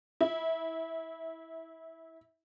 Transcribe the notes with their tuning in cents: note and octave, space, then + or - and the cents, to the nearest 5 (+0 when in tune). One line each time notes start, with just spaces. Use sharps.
E4 -20